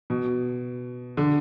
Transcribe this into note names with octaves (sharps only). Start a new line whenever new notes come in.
B2
D3